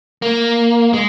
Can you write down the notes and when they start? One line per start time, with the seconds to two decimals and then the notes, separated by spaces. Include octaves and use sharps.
0.22 A#3
0.94 G#3